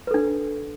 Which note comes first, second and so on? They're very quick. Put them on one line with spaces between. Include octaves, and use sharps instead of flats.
B4 A4 D4